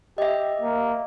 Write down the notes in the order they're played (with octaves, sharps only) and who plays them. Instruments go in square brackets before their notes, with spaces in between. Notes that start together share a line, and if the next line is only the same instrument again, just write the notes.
[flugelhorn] G4 [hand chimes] D#5 E5
[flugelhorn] A#3